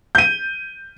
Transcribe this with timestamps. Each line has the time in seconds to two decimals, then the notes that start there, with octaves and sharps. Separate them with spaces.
0.15 G6 D#7